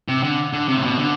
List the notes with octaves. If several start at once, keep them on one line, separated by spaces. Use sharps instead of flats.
C3
D3
D3
C3
A2
B2
D3